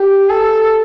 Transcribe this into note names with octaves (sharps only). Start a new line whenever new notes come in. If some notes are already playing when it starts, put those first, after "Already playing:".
Already playing: G4
A4